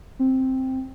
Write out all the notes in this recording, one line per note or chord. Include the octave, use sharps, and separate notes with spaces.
C4